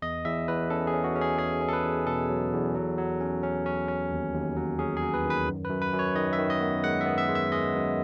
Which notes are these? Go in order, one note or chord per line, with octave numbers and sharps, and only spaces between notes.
E2 D#5
E2 E5
E2 B4
C#4 A4
G#4
C#4
F#4
C#4
G#4
C#4 G#4
C#4
A4
B4
E2
B2 A4
F#3
E2
F#3
F#3
C#4
C#4
C#4
C#4
D#2
D#2
F#3
C#4 G#4
G#4
F#3
B4
D#3 B4
F#2
B4
F#2
B4
F#2
C#5
D#3 D#5
E5
D#3
D#5
B3
G#3 F#5
E5
B3
E5
G#3
E5
G#3 D#5
F#2